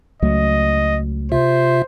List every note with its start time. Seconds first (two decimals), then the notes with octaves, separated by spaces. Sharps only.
0.22 C#2 F#3 A3 D#5
1.32 C3 F4 C5 E5